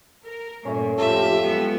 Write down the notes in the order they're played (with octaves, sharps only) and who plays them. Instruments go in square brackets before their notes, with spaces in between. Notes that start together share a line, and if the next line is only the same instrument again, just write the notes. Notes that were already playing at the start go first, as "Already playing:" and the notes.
[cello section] A#4
[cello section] G2 A#2 [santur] A3 C#4
[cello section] F2 A2 F3 [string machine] F4 G4 [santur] A4 [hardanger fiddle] E5
[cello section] F#3 G#3 B3